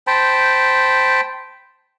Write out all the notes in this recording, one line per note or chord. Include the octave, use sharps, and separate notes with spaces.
C5 G5 A5 B5